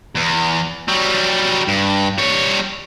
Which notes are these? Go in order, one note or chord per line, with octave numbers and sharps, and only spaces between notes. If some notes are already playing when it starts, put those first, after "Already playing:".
E2
F#3 G3
G2
G3 C#5